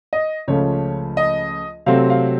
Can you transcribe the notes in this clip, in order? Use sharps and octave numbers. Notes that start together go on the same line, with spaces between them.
D#5
C#2 C#3 F3 A3 C#5
D#5
C3 F#3 A3 C4 F5
F5